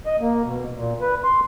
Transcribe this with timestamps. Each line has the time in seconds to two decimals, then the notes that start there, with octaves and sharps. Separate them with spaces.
0.06 D#5
0.21 A#3
0.44 B2
0.75 A#2
1.01 B4
1.24 C6